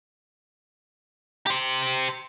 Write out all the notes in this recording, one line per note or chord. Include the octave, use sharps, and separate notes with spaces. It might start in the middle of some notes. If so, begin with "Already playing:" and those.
G4 C5